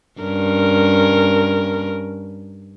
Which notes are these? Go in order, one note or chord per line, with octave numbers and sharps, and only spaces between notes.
G2 C#4 A#4